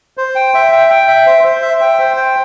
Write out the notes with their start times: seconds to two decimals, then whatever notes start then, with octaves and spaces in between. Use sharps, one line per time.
0.18 C5
0.35 G5
0.54 E5
0.72 G5
0.90 G5
1.08 E5
1.26 C5
1.44 C5
1.62 E5
1.81 G5
1.99 C5
2.17 G5